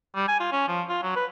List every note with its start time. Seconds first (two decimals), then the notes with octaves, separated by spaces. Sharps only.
0.15 G3
0.28 G#5
0.40 F4
0.52 C#4
0.68 F3
0.89 F4
1.03 F#3
1.16 B4